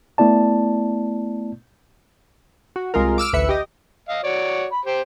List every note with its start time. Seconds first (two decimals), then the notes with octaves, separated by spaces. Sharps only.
0.18 A3 B3 E4 D5 A5
2.76 F#4
2.94 C2 G#3 F4 A#4
3.18 D6 E6 F6 D7
3.33 A1 D2 B4 E5 B5 C#7
3.49 G4 D#5
4.09 D#5 F5
4.24 F#4 C#5 D5
4.72 B5
4.85 G4 C5